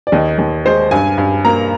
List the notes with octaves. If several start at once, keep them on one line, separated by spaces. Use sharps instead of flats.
D5
D#2 D#5
D#2
G#3 C5
G2 G#5
G2 G#5
A#3 A#5